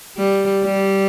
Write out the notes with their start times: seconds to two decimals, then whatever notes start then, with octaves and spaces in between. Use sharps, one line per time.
0.18 G3
0.65 G3